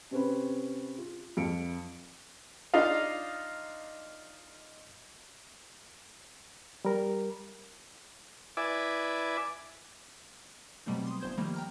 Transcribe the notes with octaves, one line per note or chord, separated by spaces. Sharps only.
C3 C4 C#4 B4
F4
F2 F5 C#7 D7
D4 D#4 F4 D#5 F5
G3 A#4
E4 B4 D5 E5 G#5 D6
B2 F#3 G3 A3 C4
C6 D#6
G1 C5 G6 G#6
D#3 F3 G3 A3 A#3
G5 A#5 F6